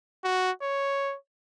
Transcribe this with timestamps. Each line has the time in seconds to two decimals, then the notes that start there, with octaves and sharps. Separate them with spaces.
0.24 F#4
0.62 C#5